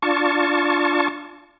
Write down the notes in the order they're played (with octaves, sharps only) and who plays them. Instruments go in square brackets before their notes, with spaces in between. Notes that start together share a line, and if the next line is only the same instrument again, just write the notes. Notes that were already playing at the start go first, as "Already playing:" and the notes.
[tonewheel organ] D4 F4 A5 C#6